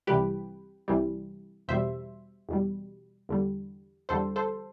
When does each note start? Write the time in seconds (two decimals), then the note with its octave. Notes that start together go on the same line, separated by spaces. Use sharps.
0.07 C2 C3 E3 G3 G4 B4
0.88 C2 C3 E3 G3
1.68 E2 B2 G3 C5 E5
2.49 E2 B2 G3
3.29 E2 D3 G3
4.09 E2 D3 G3 A4 C5
4.36 A4 C5